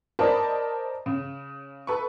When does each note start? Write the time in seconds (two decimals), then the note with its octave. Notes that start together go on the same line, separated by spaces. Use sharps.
0.19 A#4 C5 D5 D#5 A5 B5
1.06 C#3
1.87 A4 B4 B5 C#6